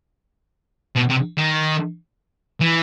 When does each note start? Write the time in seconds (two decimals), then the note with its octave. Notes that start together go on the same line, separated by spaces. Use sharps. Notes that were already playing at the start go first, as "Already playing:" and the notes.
0.96 B2
1.10 C3
1.37 D#3
2.61 E3